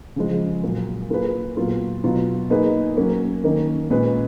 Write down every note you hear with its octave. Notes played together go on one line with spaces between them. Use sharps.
C#3 F3 G#3
A#2 F#3 A#3
A#3 F4 G#4 B4
A#2 F#3 B3 F4
B2 F#3 B3 F4
A#3 D#4 G#4 B4
F#3 A#3 C#4
D#3 A#3 C#4
A#2 G#3 C#4 G#4 B4